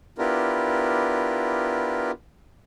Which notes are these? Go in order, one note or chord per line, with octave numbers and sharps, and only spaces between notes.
B3 D4 E4 F4 G4 A#4